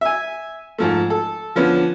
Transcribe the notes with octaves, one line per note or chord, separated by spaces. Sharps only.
E5 G#5
G#2 F3 A3
A4
D3 F3 B3 C#4